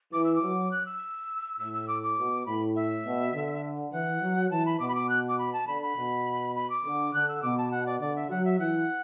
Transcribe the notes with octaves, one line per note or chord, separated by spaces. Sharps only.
E3 D6
E6
D6
F#3
F#6
E6
A2 E6
E6
D6
D6
B2
A2 B5
E5
B2
D3
E3 F#5
F#3
E3 A5
B5
B2 D6
B5
D6
F#6
D6
B5
A5
D3 B5
B5
B2
B5
D6
D3
D3 F#6
E6
B2 D6
A5
F#5
D5
D3 D5
E5
F#3 F#5
E5
E3 F#5